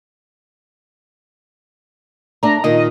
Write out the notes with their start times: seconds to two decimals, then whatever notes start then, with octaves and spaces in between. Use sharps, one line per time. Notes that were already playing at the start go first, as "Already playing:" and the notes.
2.43 A3 D4 A#5
2.64 A#2 D#3 D#5